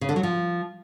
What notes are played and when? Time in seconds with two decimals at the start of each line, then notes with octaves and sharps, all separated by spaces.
0.01 C#3
0.09 D3
0.16 F#3
0.23 F3